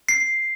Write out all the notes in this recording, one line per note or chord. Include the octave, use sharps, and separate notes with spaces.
C7